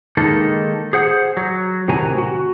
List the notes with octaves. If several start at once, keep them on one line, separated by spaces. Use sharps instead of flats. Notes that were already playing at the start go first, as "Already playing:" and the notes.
D#3 G#3 A#3 D#4 A4
G#4 C5 F#5
F#3
A2 C3 D#3 F#4 G#5 A#5
F#4